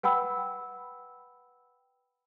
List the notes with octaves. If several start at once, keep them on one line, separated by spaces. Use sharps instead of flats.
B4 F#5 G5 B5 E6